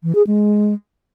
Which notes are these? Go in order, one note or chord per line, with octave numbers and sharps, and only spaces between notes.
E3
G#4
G#3